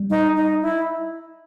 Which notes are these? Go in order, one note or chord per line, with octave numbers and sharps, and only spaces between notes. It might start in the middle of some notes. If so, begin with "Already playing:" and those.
Already playing: G3
D#4
D#4
E4